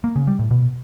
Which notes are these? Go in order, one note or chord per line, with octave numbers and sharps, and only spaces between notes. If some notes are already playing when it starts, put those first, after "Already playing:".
A#3
C#3
G3
A2
B2